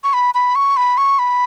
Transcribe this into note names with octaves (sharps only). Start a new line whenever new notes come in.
C#6
B5
B5
C#6
B5
C#6
B5